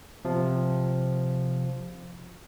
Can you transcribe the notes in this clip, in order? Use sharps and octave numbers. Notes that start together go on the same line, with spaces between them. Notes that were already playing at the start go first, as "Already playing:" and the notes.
C3 F3